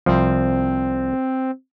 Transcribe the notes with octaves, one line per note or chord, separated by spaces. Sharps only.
C2 F3 C4